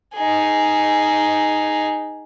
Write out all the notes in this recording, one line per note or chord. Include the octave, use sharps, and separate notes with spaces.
D#4 G#4